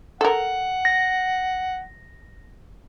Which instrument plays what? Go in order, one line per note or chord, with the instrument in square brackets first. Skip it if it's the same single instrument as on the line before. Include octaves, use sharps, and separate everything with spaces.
[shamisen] A4 A#4 [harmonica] F#5
[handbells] A#6